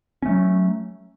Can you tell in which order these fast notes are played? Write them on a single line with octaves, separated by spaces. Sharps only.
C#4 A3 F#3